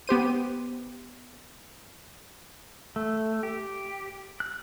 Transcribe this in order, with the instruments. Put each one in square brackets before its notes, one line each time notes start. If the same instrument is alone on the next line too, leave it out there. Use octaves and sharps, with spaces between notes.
[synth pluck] B3 G4 C5 D#7
[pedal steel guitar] A3
G4
F#6